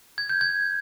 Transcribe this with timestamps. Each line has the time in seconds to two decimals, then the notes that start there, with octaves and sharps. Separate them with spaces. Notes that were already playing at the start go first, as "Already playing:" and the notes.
0.18 G#6
0.29 G6
0.41 G#6